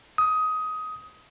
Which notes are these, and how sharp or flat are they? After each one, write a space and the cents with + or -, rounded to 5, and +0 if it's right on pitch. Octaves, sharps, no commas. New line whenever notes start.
D#6 +15